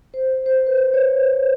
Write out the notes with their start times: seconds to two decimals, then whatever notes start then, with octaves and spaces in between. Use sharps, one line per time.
0.14 C5
0.46 C5
0.67 B4
0.78 C5
0.94 C#5
1.04 C#5